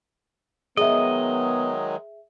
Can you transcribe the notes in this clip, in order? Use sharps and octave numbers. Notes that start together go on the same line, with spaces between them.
D#3 F#3 G#3 B3 G#4 D#5 E5